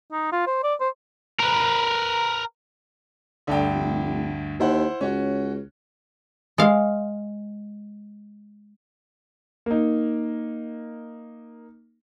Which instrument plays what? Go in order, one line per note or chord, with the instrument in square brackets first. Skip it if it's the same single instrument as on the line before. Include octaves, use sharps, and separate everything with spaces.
[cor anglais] D#4
F4
C5
D5
C5
[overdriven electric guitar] A#4 B4
[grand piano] D2 G2 G5 [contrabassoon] D3
[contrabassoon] F1
[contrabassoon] D#2 [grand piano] E4 C5 F#5
[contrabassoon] C#2 [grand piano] C#4 F#4
[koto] G#3 F5
[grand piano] A#3 D#4